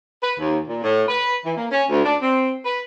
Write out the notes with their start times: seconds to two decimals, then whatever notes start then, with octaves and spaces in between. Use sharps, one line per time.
0.22 B4
0.38 D#2
0.67 A#2
0.83 A2
1.07 B4
1.44 E3
1.56 A#3
1.70 C#4
1.89 D2
2.04 D4
2.20 C4
2.64 B4